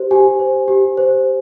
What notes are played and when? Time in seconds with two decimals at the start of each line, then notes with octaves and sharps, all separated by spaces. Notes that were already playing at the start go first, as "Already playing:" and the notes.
Already playing: G4 C5
0.11 G4 G#5
0.39 C5
0.68 G4
0.97 C5